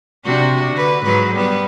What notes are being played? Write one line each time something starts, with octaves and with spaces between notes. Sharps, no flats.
C3 D4 F#4
D3 B4
G#2 F#3 B4
G3 B3 B4